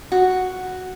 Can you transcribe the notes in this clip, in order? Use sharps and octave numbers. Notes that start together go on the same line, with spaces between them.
F#4